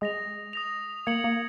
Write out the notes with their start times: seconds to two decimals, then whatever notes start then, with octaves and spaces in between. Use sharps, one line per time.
0.01 G#3 D#6 A#6 F7
0.53 D#6 A#6 F7
1.07 A#3 G#6 C#7 F#7
1.24 A#3